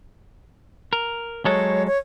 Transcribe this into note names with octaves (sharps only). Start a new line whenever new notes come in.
A#4
F#3 G#3 A4 C#5
C#5